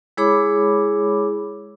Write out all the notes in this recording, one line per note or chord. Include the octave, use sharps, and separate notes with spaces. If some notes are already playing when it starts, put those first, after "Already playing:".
G#3 E4 G#4 C#5 B5 D6